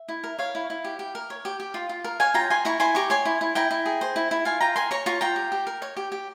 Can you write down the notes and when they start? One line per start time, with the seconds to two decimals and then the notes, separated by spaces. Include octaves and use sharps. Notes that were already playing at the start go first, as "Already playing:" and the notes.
Already playing: E5
0.09 E4
0.24 A#4
0.38 C#5 F5
0.55 E4
0.70 E4
0.85 G4
0.99 G4
1.15 A#4
1.30 C#5
1.45 G4
1.60 G4
1.74 F4
1.89 F4
2.04 A#4
2.20 C#5 F5 G#5
2.34 F4 G5 A#5
2.50 F4 G#5 C6
2.65 E4 A#5 C#6
2.80 E4 G#5 C6
2.95 G4 A#5 C#6
3.10 C#5 G#5 C6
3.25 E4
3.41 E4
3.55 E4 G5 A#5
3.71 E4
3.86 G#4
4.01 C5
4.16 E4
4.31 E4
4.45 F4 F5 G#5
4.61 F4 G5 A#5
4.76 A#4 G#5 C6
4.91 C#5 A#5 C#6
5.06 F4 A#5 C#6
5.21 F4 G5 A#5
5.36 G4
5.52 G4
5.67 A#4
5.82 C#5
5.97 G4
6.12 G4